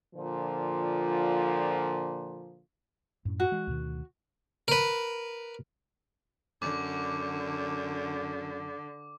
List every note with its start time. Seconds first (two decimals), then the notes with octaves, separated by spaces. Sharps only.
0.15 A#2 D3 F3
3.25 F#2 A2
3.40 F#4
3.52 E3 G#3
3.67 D2 B2 D#3
4.68 A#4 B4
6.62 F#2 D3 D6